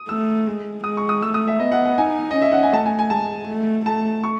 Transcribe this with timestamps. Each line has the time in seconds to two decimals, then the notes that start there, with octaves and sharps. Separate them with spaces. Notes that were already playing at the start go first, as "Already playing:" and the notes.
Already playing: D#6
0.08 A3 E6
0.47 G#3
0.84 G#3 D#6
0.97 C#6
1.09 D#6
1.22 A3 E6
1.34 D#6
1.48 E5
1.59 B3 D#5
1.72 F#5
1.85 F#5
1.98 D#4 G#5
2.31 C#4 D#5
2.42 E5
2.52 F#5
2.63 G#5
2.72 A3 A5
2.86 G#5
2.99 G#5
3.10 G#3 A5
3.48 A3
3.86 A3 A5
4.24 C#6